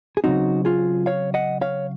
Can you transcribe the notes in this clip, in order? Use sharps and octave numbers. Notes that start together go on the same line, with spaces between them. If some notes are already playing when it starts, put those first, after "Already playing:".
G#4
C#3 F#3 C4 D#4 F#4
F4 G#4
C#5 F5
D#5 F#5
C#5 F5